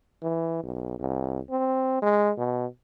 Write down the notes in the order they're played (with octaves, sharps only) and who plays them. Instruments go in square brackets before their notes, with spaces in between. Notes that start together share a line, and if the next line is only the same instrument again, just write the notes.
[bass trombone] E3
B1
C2
C4
G#3
B2